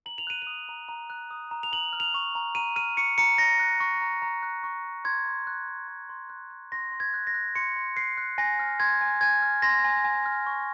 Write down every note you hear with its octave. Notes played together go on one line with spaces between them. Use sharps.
A#5 F#7
F7
F#6 D#7
D#6 F7
A#5
A#5
F#6
D#6
A#5
F7
A#5 F#7
F6
F7
C#6
A#5
A#5 D#7
F6 D#7
C#6 C#7
A#5 C#7
A#5 A#6
F#6
C#6
A#5
A#5
F#6
C#6
A#5
C6 G#6
C6
F#6
F#6
C6
C6
F#6
F#6
C6 A#6
C6
G#6
F#6
A#6
F#6
C6 C#7
C6
F#6 C7
F#6
G#5 A#6
F6
C6 G#6
G#5
G#5 G#6
F6
C6 A#6
G#5
G#5
F6
C#6